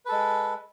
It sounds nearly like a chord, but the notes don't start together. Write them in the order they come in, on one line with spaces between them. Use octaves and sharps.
B4 A4 G#3